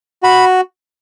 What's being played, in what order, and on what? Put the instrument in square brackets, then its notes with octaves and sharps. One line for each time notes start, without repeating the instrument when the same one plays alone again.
[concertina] F#4 B5